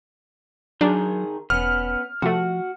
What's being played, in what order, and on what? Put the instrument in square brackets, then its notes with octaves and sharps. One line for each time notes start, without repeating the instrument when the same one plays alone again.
[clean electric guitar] D#3 G#4 A#4 [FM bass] F#3 [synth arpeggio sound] D4
[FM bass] E1 [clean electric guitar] B3 C#4 [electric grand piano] F6
[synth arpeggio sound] C3 A3 [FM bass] F3 [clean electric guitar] F#4